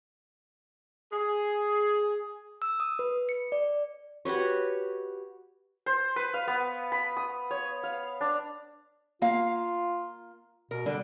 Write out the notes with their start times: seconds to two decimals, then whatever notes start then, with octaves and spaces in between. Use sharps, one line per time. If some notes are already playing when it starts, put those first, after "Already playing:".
1.12 G#4
2.62 E6
2.80 D#6
2.99 B4
3.29 C#7
3.52 D5
4.25 F#4 G4 B4 C#5
5.86 C5
6.16 B4
6.34 F5
6.48 B3
6.92 B5
7.17 D#6
7.51 C#5
7.83 F5
8.21 D4
9.22 A#3 F4 F5
10.71 B2 A#4
10.86 D3 G3